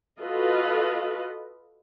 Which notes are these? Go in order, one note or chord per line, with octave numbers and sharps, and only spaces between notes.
F4 F#4 A4 B4 D#5